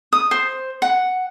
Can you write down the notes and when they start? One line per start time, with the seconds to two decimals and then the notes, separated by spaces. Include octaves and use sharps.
0.13 D#6
0.31 C5
0.82 F#5